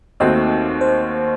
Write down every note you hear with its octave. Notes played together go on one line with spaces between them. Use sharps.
D#2 D#3 A3 C4 F#4 D#5
C5